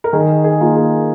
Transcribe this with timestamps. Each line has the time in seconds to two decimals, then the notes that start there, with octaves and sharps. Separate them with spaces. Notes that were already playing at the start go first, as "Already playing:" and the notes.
0.04 A#4
0.13 D#3 G#4
0.44 G#4
0.60 A#3 F4
0.76 G#4